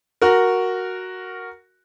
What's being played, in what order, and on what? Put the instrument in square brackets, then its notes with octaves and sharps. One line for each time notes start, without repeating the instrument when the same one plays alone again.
[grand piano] F#4 A#4